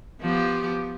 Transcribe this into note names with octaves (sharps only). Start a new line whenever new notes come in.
F3 B3 G4